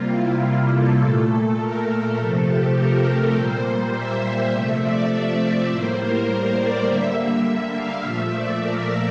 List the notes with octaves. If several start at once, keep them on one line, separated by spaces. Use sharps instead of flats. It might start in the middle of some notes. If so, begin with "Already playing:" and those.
Already playing: C3 G3 A#3 F4
E4
F4
A4
A#2 A3
A#4
A4
C3 F3 A3 A4
G4
A#4
A#2 G3 A#3 C5
E5
C3 F3 A3 E5
D5
E5
E5
A2 G3 A#3 C5
A#4
C5
D5
D3 G3 A#3 E5
E5
E5
F5
A#2 F3 A3 E5
D5
A#4